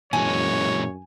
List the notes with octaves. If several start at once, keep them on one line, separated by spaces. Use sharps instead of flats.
F#2 A#2 E3 G#3 C#5 G#5